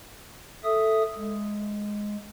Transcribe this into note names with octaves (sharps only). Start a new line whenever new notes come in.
A4 E5 D#6
G#3